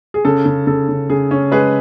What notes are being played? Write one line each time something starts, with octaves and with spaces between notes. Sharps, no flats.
G#4
C#3 A4
C#3
C#3 A4
C#3
C#3 G#4
C#4
G#3 G#4 B4